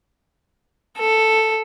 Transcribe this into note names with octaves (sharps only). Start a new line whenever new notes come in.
A4